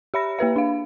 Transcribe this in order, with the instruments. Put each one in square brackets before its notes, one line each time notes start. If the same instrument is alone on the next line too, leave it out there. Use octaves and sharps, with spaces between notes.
[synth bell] G4 E5 B5 A#6
A#3 G4 B4 E5
D4 F5